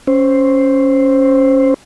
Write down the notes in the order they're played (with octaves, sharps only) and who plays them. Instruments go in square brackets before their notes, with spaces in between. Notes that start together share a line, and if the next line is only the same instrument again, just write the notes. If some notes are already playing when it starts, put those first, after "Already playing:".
[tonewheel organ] C#4 C5